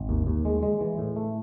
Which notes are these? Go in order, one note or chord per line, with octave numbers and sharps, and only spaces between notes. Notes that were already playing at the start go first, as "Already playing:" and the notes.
Already playing: G#1
D#2
D#2
G#3
G#3
E3
A2
A3